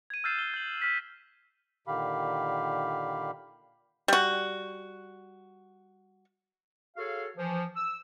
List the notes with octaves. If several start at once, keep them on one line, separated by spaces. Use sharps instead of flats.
G#6 D#7
E6 F6 G6 A6 C7 E7
G7
G6 F#7
F6 B6
A#2 D3 D#3 G4 F5 B5
G3 F#4
F#4 G#4 A4 C#5 F5
E3 F3
E6